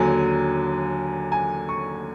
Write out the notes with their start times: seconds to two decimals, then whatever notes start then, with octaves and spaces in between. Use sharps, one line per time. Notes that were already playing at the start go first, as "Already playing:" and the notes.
Already playing: D#2 D3 F#3 G#5
1.32 G#5
1.69 C#6